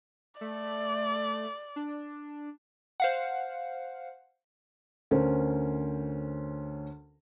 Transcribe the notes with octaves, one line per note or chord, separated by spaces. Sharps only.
A3 D5
D4
C5 F5 F#5
D2 C#4 A#4 C5